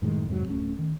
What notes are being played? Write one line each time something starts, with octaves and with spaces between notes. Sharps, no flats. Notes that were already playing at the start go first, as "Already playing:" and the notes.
F#2 A2 D#3 G#3
F2 G#2 C3 F#3
D1 A3 C#4
D#3